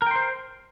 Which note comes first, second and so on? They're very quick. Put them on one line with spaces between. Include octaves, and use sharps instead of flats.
A#4 G5 C6 C5